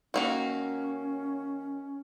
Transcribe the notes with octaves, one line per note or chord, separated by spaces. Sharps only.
D#3 A#3 C#4 F#4